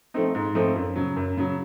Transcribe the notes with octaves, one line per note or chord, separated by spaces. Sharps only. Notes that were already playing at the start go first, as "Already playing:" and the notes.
F3 A3 C4 D#4
G#2
F3 A3 C4 D#4
F#2
C#3 F#3
F#2
C#3 F#3